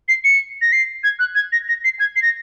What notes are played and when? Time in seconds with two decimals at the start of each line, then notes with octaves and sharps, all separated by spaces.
0.08 C7
0.24 C#7
0.62 A#6
0.73 C7
1.04 G#6
1.19 F#6
1.35 G#6
1.52 A#6
1.68 A#6
1.84 C7
1.99 G#6
2.16 C7
2.22 A#6